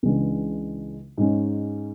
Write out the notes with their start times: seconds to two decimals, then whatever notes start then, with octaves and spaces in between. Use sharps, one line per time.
0.03 C#2 C#3 E3 G#3 D4
1.18 G#2 G#3 C#4